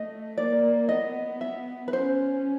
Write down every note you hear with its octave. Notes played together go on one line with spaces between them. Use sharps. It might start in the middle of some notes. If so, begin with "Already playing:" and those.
Already playing: A3 D#5
A#3 D5
B3 D#5
E5
B4
C#4 C5